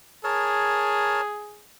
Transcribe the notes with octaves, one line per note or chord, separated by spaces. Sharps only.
G#4 A#4 C#5 A5